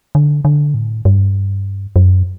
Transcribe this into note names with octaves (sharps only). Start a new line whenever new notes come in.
D3
D3
A2
G2
F#2